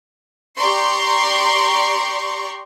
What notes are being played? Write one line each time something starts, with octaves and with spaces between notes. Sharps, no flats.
G4 D5 A#5 C6 C#6